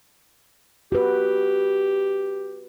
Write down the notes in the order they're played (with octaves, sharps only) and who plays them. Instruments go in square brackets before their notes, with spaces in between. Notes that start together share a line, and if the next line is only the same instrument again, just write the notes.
[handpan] F#4 B4 [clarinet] G4